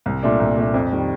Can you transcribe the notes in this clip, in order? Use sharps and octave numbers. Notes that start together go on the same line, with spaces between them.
C2
A#2 A3 D4
C2
A#2 A3 D4
F2
D#3 G3